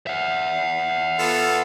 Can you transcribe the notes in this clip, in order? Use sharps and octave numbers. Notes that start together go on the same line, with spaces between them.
E5 F#5
B3 F4 A4